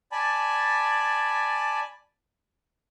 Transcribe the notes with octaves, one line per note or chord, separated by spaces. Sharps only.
D5 G#5 A5 B5